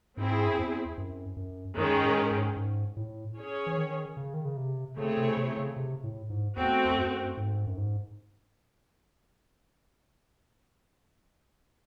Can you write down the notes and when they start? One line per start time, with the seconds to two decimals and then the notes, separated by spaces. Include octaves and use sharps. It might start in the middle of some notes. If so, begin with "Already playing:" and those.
0.17 G#2 C4 E4 G#4
0.46 F#2
0.57 E2
0.98 F#2
1.37 F#2
1.77 F#2 D#3 G#3 C#4 G#4
2.03 A2
2.31 G#2
2.57 G#2
2.97 A2
3.37 C#4 G#4 C#5
3.66 E3
3.77 D#3
4.17 C#3
4.34 D#3
4.45 C#3
4.57 C3
4.97 C#3 A3 C4 E4 G#4 C#5
5.17 C3
5.37 C3
5.57 C#3
5.76 C3
6.04 A2
6.30 G#2
6.57 E2 A3 C4 F#4
6.90 E2
6.97 F#2
7.37 G#2
7.67 F#2
7.77 G#2